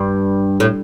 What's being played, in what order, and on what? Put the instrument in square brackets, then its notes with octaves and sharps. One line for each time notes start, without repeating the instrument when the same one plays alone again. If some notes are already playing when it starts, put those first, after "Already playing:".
Already playing: [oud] G2
A2